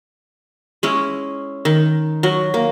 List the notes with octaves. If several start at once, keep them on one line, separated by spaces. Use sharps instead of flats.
G#3 C#4 E4
D#3
F#3
A#3